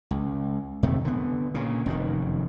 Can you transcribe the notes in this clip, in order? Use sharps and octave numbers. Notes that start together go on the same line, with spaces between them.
C#2
F2 C3 D#3 A3
D3 B3
A#2 C#3
F1 F#2 B2 D#3